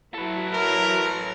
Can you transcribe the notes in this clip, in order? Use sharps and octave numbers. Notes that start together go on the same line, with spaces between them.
F#3 E4 A4 B4
A#4